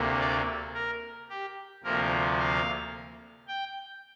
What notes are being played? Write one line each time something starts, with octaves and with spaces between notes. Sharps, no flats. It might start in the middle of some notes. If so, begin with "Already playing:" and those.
Already playing: D2 C3 A#3
D5
A#4
G4
D2 C3 F3 A#3 A#4
F5
G5